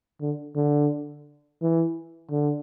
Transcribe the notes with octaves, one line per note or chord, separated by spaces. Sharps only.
D3
D3
E3
D3